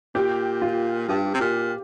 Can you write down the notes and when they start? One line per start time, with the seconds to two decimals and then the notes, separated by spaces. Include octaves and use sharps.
0.15 A#2 G4
0.62 F4
1.08 G2 G4
1.34 C3
1.40 A#2 G4